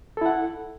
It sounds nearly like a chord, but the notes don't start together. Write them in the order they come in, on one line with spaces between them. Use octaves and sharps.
A4 E4 F#5